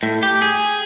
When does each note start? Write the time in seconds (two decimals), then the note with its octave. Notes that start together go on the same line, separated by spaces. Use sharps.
0.03 A2
0.23 G4
0.42 G#4